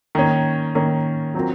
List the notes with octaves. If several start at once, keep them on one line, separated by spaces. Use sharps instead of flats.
D#3 A#3 C#4
D#3 A#3 C#4
F#3 C4 F4 A#4